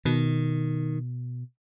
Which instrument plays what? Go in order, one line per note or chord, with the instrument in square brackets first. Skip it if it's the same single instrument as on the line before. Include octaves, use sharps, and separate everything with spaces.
[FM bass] B2 [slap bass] D#3